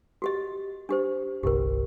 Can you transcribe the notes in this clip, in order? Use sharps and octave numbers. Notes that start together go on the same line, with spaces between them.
F#4 G4 D#5
D4 G4 C5
G1 C2 G4 A#4